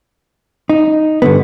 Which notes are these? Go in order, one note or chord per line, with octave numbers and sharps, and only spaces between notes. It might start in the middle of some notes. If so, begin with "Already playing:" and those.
D#4
G2 D3 B3